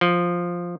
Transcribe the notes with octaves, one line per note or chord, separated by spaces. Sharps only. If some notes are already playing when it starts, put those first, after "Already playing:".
F3